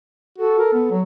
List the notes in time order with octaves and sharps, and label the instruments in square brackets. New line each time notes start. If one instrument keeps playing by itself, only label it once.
[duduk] F#4 [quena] A4
[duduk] A#4
B3
F#3